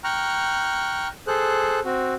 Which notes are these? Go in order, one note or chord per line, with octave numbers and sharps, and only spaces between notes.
G5 A#5 C#6 F6 F#6
G#4 A4 C5 F#6
C4 F#4